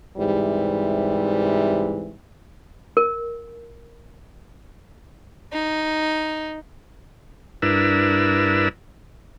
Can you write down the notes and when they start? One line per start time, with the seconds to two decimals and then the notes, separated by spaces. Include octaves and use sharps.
0.18 G#2 C3 E3 G3
2.97 A#4
5.53 D#4
7.62 G2 D4 E4 A#4 B4 E6